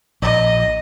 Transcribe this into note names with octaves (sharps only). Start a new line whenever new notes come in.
A#1 D#5